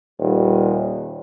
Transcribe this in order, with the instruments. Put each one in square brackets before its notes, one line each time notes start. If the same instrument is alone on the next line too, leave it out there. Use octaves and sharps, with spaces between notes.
[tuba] D#1